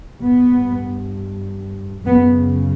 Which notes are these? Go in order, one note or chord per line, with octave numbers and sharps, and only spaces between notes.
G2 B3
F#2 C#3 B3